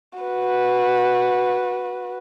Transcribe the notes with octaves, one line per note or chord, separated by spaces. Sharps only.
F#4 B4